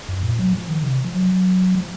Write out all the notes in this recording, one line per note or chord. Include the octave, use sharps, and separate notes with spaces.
F#2
A#2
F#3
F3
D#3
C3
F3
F#3
F3